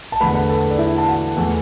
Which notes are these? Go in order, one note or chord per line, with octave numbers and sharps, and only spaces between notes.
A5
E2 D3 A3 B4 B5
B4 B5
A4 A5
D5
E4 E5
A5
F#4 F#5
E2 E3 A3